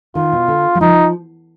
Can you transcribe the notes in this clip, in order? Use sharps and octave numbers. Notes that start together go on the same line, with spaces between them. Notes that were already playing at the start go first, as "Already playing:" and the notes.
D#3 F4
B2
D3
F#3
F3 D#4